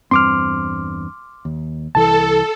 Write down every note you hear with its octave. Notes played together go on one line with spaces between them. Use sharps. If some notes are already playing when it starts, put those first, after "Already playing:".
E2 G2 C4 C6 D6 F6
D#2
C2 E3 A4 A5